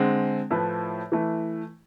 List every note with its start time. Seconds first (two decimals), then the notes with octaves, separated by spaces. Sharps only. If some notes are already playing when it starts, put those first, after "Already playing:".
Already playing: D3 G#3 C4
0.51 A2 F3 A3 E4 B4
1.12 E3 A3 E4